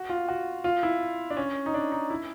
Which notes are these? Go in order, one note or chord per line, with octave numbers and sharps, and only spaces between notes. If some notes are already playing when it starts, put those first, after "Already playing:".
Already playing: F#4
F4
F#4
F4
E4
D4
C#4
D#4
D4
D#4
E4